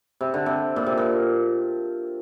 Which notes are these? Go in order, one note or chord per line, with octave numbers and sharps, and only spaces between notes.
C3
D3
C3
A#2
C3
A#2